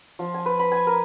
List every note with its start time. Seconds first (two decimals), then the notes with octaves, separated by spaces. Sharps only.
0.19 F3
0.34 G#5
0.46 B4
0.59 B5
0.72 G#5
0.87 A#4